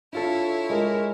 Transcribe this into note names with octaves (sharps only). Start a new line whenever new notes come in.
D4 E4 F4 A4 C#5
G#3 A#4